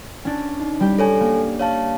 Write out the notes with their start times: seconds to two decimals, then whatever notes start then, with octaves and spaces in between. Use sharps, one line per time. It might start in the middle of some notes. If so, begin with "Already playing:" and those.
0.25 C#4 D4
0.60 D#4
0.80 G3 G4
0.99 A4 C#5 G#5
1.21 A#3
1.59 C#5 F5 A5